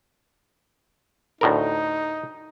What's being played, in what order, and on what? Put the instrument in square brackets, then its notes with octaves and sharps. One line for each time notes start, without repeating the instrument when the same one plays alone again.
[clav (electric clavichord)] D2 A2 A#4 [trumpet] D#4